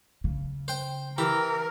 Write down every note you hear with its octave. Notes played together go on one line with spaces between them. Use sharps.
C#3
C5 G5
E3 G4 A#4